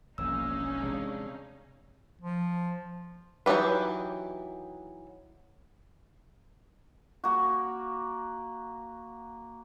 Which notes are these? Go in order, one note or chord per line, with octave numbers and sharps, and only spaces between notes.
E1 A#1 A#3 C#4 D#4 F5 E6
C3 G#3 D4
F3
E3 F#3 D#4 G4 B4
A#3 F#4